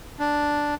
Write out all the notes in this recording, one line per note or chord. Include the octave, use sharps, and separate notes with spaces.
D4